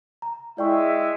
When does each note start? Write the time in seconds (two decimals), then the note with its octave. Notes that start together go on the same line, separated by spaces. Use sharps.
0.22 A#5
0.58 G#3 E4 D5 E5 G5 C#6